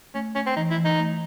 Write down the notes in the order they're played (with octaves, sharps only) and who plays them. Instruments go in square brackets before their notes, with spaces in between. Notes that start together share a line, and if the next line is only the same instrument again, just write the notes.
[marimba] A3 [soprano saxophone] C#4
[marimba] A3 [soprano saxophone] C#4
[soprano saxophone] C4
[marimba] E3 [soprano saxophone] D#4
[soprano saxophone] E4
[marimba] E3
[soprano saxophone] D#4
[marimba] A3